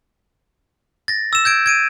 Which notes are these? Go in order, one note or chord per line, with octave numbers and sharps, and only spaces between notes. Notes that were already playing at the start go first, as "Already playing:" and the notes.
A6 A#6
E6 E7
G6 G#6 D7
G#6 D7 D#7